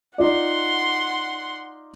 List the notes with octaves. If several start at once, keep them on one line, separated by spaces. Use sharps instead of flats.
D#4 F4 D5 F#5 C6